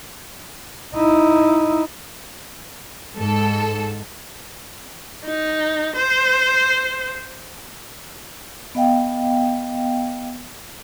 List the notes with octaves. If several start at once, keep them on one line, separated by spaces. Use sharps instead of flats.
D#4 E4
G#2 A4
D#4
C5
B3 D#5 F5 G5